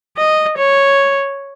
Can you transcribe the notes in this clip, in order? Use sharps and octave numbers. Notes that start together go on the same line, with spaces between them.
D#5
C#5